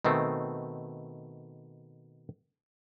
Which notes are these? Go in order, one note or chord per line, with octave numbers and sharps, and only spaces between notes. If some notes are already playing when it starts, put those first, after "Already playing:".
B2 D#3 A3 C4